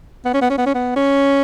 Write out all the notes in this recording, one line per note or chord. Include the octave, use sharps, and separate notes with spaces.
B3
C#4
B3
C#4
B3
C#4
B3
C#4